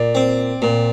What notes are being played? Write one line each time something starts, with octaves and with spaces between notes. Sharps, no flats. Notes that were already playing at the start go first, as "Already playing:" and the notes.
Already playing: A#2 D5
C4
A#2